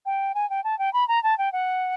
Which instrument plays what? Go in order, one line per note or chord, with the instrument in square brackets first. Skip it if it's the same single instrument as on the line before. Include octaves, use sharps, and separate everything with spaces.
[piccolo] G5
G#5
G5
A5
G5
B5
A#5
A5
G5
F#5